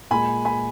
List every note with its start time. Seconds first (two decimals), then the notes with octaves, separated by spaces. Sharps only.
0.11 A#2 G#3 G#5 B5
0.45 G#5 B5